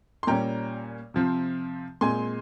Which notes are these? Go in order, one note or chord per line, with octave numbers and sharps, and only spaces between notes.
C6
A#2 G3 C#4 G5 A#5
C3 F3 C4
A#2 G#3 C4 G#5 C6